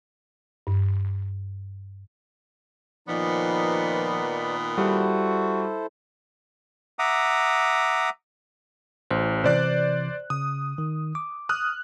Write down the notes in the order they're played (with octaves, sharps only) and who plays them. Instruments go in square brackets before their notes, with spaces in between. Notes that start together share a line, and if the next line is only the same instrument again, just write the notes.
[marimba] G2
[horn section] A#2 D#3 B3 [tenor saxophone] F3 [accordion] D#4 B4 D5
[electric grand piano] G3 [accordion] E4 A4 C5 [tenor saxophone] F#4
[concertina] E5 F#5 A#5 D6 D#6
[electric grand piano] A1 [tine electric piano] C5
[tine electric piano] C3 E3 [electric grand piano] C5 D5 F#6
[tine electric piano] C#3 [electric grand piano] D#6
[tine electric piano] D#3
D6
[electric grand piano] D#6 F6 F#6